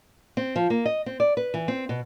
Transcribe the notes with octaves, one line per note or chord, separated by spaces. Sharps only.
C4
F3
A#3
D#5
C4
D5
B4
E3
C4
B2